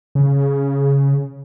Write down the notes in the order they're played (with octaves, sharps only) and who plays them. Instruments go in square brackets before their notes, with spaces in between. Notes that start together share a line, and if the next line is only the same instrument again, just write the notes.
[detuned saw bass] C#3